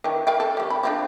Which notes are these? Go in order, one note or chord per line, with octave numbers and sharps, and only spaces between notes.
D#3 E3 D4
A#4 F5 G5
A4
D#3 G3
B5
F3 C4 D4